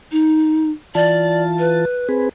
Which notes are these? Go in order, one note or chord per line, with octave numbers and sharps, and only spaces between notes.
D#4
E3 F4 D5 A5
B4
C4 G#4 B4